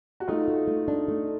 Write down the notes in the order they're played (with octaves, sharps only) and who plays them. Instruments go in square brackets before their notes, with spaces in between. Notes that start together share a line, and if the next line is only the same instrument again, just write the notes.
[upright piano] F#4
[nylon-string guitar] A3 [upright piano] D#4 F4
[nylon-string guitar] F#4
A3
D4
A3